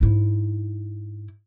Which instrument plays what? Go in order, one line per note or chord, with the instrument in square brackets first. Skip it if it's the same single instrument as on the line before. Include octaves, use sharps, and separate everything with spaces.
[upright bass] G#2 E4